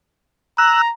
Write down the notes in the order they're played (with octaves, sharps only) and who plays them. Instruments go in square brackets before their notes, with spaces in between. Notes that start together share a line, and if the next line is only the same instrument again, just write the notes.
[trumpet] A#5 [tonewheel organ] E6 F#6